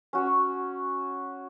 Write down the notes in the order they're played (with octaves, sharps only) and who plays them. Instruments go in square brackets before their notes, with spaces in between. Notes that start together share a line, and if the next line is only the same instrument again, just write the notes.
[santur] C#4 F#4 C#5